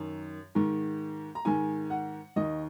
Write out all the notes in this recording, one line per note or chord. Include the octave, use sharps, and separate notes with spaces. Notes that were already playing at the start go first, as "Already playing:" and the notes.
Already playing: F#2 D#3
G#2 D#3
A#5
G#2 D#3 G#5
F#5
D#2 D#3 D#5